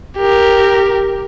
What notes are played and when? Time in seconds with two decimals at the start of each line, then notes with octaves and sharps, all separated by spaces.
0.18 G4 A#4